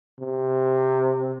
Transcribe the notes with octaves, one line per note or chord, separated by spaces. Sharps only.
C3